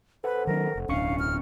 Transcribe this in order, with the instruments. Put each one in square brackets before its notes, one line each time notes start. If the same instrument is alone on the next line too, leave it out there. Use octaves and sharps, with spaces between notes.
[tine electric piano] A4 C5 F#5 [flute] B4
[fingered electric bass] D#3 F#3 D4 [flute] A#4
[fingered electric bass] F1
[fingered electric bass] D1 B1 D4 [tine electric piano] C#4 C#6 C#7 [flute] F5
[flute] F6